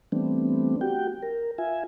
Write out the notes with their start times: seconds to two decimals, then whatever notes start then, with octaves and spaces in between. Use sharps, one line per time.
0.12 E3 G3 A3 B3 C4 D4
0.81 F#4 G4 G5
1.23 A#4
1.58 F4 E5 G#5